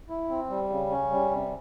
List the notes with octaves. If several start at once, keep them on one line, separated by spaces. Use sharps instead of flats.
E4
C4
G3
C#3
C#4
G3
C3